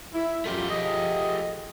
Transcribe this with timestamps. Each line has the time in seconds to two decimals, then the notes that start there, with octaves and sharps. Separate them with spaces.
0.14 E4
0.45 F#2 A3 F4 G4
0.70 F3 G#4 D#5